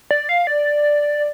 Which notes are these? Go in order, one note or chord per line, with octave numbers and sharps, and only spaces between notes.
D5
F5
D5